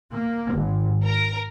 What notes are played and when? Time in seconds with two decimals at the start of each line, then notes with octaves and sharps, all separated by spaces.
0.11 A#3
0.53 G#1
1.04 A#4